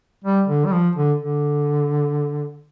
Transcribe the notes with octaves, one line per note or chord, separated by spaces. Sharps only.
G3
D3
G3
F3
D3
D3